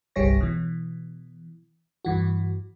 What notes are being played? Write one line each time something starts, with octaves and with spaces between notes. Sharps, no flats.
G1 C2 G3 G#4 C#5 A#6
B2 E3
G2 E3 F#4